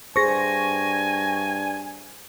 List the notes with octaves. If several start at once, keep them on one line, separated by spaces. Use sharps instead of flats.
G2 G#4 C5 G#5 C#6 A#6